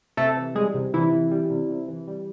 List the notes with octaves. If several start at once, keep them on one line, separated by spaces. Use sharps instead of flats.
C3 A3 A4
E3
G3 G#3 G#4
C3
C3 E3 E4
E3
G3
C3
C3
E3
G3